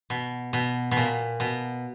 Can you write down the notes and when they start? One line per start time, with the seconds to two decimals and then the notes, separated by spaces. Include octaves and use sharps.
0.10 B2
0.53 B2
0.91 B2
0.97 A#2
1.40 B2